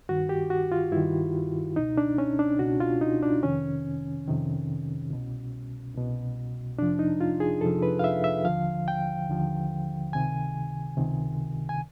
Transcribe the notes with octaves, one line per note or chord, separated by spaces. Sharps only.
G2 D#3 F#4
G4
F#4
F4
G2 D#3 E4
C#2 B2 D#4
D4
C#4
D4
C#2 B2 F#4
F4
D#4
D4
F2 C3 D#3 C#4
F2 C3 D#3
C2 B2
C2 B2
F2 C3 F3 D4
D#4
F4
G#4
F2 C3 F3 A4
B4
F5
E5
E5
D#2 D3 F3 F5
G5
D#2 D3 F3
C#2 C3 D#3 G#5
C#2 C3 D#3
G#5